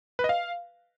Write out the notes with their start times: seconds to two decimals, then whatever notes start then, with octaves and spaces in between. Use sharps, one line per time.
0.19 B4
0.24 D#5
0.29 F5